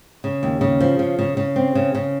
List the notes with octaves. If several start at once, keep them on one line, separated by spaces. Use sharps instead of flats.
C#3
D#2
C#3
F3
C#3
C#3
C#3
C4
C#3
C#3